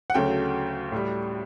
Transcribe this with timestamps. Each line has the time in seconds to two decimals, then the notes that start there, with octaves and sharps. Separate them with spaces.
0.10 F#5
0.14 D2 C#3 F#3 A3 G5
0.92 A2 G3